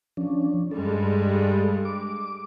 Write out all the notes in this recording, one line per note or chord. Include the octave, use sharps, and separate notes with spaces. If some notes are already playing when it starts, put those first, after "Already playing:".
F3 C#4 D4
G2 G3 G#3 A4
D6